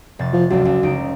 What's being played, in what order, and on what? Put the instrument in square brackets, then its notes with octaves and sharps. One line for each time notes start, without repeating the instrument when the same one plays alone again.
[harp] F1 A6
[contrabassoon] F3
[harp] F#1 C#2 [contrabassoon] F#3
[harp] C#2
C#2 D#4 D7